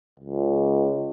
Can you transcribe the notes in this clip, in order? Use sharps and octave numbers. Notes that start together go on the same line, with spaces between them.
C#2